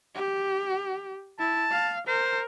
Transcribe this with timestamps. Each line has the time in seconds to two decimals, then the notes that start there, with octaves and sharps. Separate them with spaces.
0.15 G4
1.39 E4 A5
1.71 F5
2.08 A#4 C5